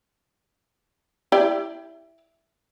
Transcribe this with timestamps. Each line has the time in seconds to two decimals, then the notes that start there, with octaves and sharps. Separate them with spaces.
1.32 E4 G4 D5